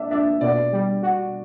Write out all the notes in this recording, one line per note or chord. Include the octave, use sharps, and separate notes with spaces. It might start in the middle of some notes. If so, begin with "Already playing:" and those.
Already playing: D4 E5
D4 E5
B2 D5
G3
F#4